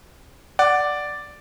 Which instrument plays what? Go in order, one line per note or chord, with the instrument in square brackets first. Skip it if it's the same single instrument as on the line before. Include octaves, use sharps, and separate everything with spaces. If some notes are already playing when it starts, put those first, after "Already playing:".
[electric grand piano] D5 D6 [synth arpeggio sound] F#5